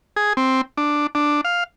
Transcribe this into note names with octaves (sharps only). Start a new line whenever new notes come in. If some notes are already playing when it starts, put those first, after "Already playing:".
G#4
C4
D4
D4
F5